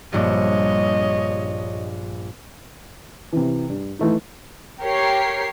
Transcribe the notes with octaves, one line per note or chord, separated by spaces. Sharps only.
A#1 G2 C#5 D#5
C3 E3
G2
E3 A3 D#4
G4 A#4 C#5 C7